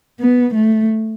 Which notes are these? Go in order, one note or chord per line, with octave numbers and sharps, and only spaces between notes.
B3
A3